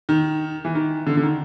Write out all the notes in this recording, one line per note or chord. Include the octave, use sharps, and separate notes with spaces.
D#3
E3
D#3
D3
D3
D#3